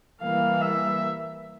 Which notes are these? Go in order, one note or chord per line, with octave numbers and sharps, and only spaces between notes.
E3 G3 A#3 F5
E5